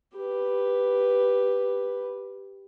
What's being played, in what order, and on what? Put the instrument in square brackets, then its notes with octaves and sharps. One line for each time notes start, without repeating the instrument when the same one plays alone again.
[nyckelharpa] G4 B4